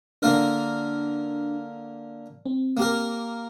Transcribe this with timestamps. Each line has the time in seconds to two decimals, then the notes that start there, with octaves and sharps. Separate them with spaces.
0.22 D3 A#3 D4 F4 A#4
2.46 C4
2.77 A#3 G4 A#4